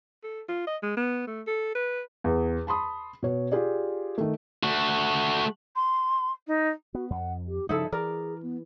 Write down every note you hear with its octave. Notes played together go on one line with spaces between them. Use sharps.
A4
F4
D#5
G#3
B3
A3
A4
B4
E2
A5 B5 C6 D#6
B2 C#5
F4 G4 G#4 D5
D#3 A3
A3 F#4
C6
D#4
B3 F#4
F2 F#5
G4
G2 C#3 F3 D#4 E4 A4
E3 G#4 A#4 D5
B3